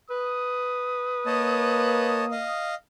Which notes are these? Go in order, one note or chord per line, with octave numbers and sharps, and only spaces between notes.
B4 D#6
A#3 C#5 D#5 A5
D#5 F5